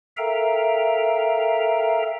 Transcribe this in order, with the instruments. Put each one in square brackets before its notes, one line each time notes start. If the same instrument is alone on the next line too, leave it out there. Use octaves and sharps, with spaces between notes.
[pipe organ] A4 A#4 E5 F5 G5 A#5